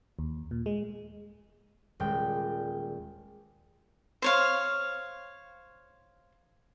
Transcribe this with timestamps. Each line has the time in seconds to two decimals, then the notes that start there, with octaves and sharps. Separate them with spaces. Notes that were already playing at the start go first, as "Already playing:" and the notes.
0.19 D#2
0.51 A#2
0.66 G#3
2.00 D#1 G3 G#3 G5
4.22 C5 C#5 F5